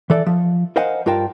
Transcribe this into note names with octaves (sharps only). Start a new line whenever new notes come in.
E3 A4 D5
F3
A#4 C5 D#5 F5 F#5 G#5
G2 F4 A#4 G5 A5